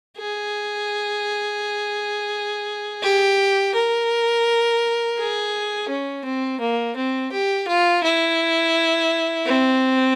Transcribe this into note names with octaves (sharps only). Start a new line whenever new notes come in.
G#4
G4
A#4
G#4
C#4
C4
A#3
C4
G4
F4
E4
C4